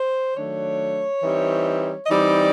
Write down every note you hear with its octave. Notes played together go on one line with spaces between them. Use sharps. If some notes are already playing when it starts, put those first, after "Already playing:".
Already playing: C5
D#3 F#3 A3 D4 C#5
E3 G3 C4 D#4
D#5
E3 G3 C4 D#4 D5